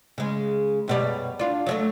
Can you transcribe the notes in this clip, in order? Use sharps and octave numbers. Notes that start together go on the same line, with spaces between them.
C#3 G#3
F#2 B2 G3
D4 F4
F#3 G3 A3